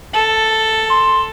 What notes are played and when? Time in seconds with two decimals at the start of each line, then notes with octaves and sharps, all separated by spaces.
0.15 A4
0.90 C6